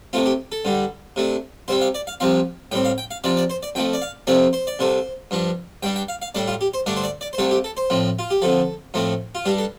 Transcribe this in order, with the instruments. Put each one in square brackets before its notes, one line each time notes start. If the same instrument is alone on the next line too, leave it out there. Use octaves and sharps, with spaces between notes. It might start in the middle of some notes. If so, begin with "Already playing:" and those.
[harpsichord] C3 A3 C4 F4
G4
A4
G2 D3 G3
C3 A3 D4
C2 C3 G3 C4 C5
F5
D5
F5
C2 C3 F3 C4 F5
A2 G3 C4 G5
F5
G5
F5
C3 F3 C4 D5
D5
C5
D5
F2 F3 A3 G5
D5
F5
C3 F3 A3 C4 D5
C5
D5
C2 C3 A3 C5
G2 F3 D4
G2 G3 D4 G5
G5
F5
F5
A2 G3 D4 D5
F4
G4
C5
G2 D3 A3 D4 D5
C5
D5
D5
C5
C2 C3 A3 C4 A4
G4
A4
C5
A2 F3 C4
F4
G4
F2 D3 F3 A4
A2 F3 A3 C4
F4
G2 G3 D4 G4
A4